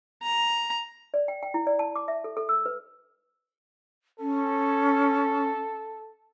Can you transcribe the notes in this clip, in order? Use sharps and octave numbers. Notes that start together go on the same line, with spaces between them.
A#5
D5
G5
G5
E4
D5
A5
D6
E5
A4
A4
E6
B4
C#4 A4